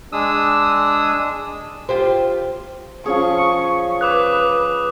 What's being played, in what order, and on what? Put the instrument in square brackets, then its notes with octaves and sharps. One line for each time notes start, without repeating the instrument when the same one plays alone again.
[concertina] G#3 D4 D#6 E6
[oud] F4 G4 C5
[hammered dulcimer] F3 C#4 G#4 [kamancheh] C#6
[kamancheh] B4 [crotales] D6 D#6 F#6